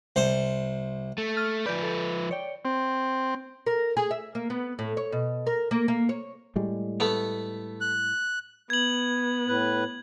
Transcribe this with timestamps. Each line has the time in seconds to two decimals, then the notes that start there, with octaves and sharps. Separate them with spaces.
0.16 C2 C5
1.18 A3
1.37 F6 A6 D#7
1.66 F3 B4 D5 G6
1.83 A4
2.31 C#5 D5 G5
2.65 C4
3.66 A#4
3.97 G#4
4.11 E5
4.35 A#3
4.50 B3
4.79 A2
4.97 C#5
5.12 B2
5.47 A#4
5.71 A#3
5.88 A#3
6.09 C#5
6.56 A2 G3 G#3
7.00 A3 B3
7.81 F#6
8.70 B3 G#6 F#7
9.47 A2 B4